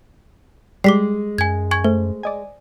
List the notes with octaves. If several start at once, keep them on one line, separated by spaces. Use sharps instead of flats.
G3 G#3 G4 D6 B6 C7
F#2 G#5 G#6
G#5 C#6 G#6
A3 C5
D5 D#5 G#5